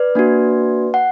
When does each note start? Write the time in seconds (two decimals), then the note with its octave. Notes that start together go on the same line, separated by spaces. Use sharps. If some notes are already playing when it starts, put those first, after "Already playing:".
Already playing: B4 D5
0.15 A#3 D4 F#4
0.94 F#5